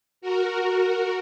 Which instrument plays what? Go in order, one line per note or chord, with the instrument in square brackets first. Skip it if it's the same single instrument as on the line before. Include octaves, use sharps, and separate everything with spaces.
[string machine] F#4 A#4